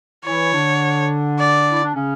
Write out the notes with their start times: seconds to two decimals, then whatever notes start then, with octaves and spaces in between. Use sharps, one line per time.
0.25 E3 E4 C#5
0.53 D3 D4
1.39 D5
1.71 E4
1.84 D4
1.95 C#3 C#4